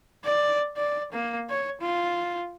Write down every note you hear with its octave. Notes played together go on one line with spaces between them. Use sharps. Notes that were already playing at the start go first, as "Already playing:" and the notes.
D5
D5
A#3
C#5
F4